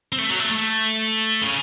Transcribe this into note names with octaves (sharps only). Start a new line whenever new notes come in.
C4
A3
F#3
A3
A3
C#3